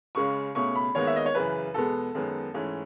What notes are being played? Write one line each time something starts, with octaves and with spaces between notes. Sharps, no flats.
C#2 C#3 G#3 C#4 C#6
C#2 B2 A3 C#4 C#6
B5
D#2 D#3 G#3 B3 C#5
E5
D#5
C#5
F#2 C#3 E3 B4
E2 B2 G#3 B3 A4
F#2 D#3 G#3 B3
G#2 E3 A3 C#4